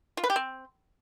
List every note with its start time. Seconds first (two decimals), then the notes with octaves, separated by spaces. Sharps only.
0.17 F4
0.24 B4
0.30 G4
0.36 C4